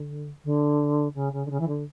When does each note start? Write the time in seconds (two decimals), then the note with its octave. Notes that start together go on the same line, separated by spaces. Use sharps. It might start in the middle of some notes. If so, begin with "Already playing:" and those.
Already playing: D3
0.44 D3
1.14 C#3
1.32 C#3
1.45 D3
1.50 C#3
1.59 E3
1.67 D3